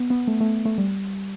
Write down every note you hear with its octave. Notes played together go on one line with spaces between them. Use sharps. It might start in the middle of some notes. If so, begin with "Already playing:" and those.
Already playing: B3
B3
A3
A3
A3
G3